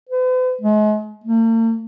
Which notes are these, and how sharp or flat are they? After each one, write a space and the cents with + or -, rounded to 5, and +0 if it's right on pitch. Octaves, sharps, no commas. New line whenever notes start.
B4 +45
G#3 +40
A#3 -45